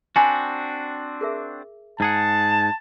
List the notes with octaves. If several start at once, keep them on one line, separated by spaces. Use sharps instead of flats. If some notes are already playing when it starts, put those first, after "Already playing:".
C4 D4 F#4 G#5 A#5 B5
G#4 A#4 E5
G#2 G#4 F#5 A5 A#5